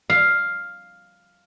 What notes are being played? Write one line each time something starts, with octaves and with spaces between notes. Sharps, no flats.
F5